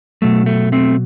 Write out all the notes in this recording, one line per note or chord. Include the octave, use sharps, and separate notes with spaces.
B2 F#3 A3
A3
A3 C4